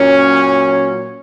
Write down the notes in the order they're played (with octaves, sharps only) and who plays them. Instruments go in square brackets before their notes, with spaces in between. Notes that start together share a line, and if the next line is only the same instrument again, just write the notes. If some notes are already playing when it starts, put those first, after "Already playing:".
Already playing: [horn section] A#2 F#3 C#4